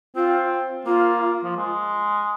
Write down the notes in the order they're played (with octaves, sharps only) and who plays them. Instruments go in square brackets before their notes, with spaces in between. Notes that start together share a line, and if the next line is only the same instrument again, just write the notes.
[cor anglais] C4 [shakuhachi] F4
[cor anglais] A#3 [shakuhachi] F4
[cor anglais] F3
G#3